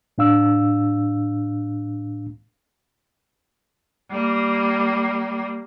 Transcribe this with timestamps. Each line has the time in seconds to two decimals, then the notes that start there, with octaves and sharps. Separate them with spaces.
0.18 A2 D4 F5 E6
4.11 G3 A#3